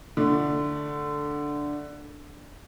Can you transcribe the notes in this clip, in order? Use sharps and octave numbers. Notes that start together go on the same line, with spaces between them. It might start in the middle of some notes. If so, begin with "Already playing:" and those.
D3 A3